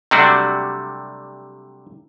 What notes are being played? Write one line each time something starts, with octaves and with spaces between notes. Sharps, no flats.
C3 F#3 G3 A3 D4 F#4